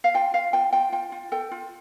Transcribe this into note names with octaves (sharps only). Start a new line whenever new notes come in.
F5
F4 G5
F4 F5
F4 G5
F4 G5
F4 G5
F4
A4 G5
F4